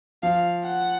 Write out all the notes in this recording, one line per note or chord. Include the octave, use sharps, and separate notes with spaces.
F3 F5
F#5